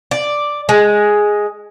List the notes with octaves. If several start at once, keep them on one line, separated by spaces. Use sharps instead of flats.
D5
G#3